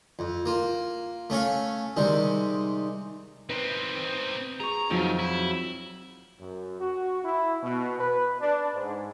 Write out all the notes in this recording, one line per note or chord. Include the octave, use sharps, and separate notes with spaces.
F2
A#3 F4
A3 C#4 C#5 F5
C3 D#3 G3 G#3
C4 D#4 B4
G#4 A#5 C#6
F2 D#3 F3 F#3
E4
F#2
F#4
E4
B2
B4
D4
G#2